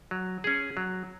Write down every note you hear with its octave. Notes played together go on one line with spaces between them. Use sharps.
F#3
C#4 G#4
F#3